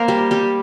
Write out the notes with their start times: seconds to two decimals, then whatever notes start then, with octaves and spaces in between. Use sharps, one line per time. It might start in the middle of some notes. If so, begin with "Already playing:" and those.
Already playing: A#3 A#4 C5
0.08 G3 G4
0.31 G3 G4